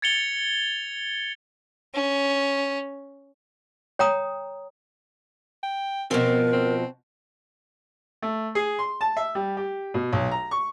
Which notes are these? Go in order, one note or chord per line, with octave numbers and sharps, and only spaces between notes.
G#6 A6 C#7 F7 G7
C#4
C#5 G5 A#5 D#6
G5
B2 F3 C4 A#4
C4
A3
G#4
C6
A5
E5
G3
G4
B2
B1
A#5
C#6